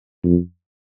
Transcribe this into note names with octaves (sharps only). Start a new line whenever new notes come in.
F2